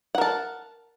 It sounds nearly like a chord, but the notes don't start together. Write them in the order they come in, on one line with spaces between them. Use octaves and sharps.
F#5 A#4 A5